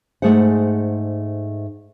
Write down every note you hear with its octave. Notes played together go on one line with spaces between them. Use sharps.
G#2 F3 A3 G#4 C5 F#5